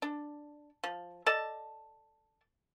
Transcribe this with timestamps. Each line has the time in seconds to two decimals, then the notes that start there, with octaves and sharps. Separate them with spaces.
0.02 D4
0.84 F3
1.26 A4 D5 D#5 A5